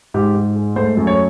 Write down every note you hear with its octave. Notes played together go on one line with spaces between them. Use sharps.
G#2 G4
G#2
G#3
A3 C5
F#2
C#5